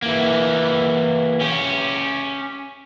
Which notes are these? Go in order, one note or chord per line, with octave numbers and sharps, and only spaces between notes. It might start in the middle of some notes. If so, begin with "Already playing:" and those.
E3 A#3
C#4 G4